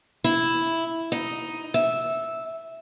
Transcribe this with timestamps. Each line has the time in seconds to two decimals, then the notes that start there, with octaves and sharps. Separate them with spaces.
0.24 E4
1.12 D#4
1.74 E5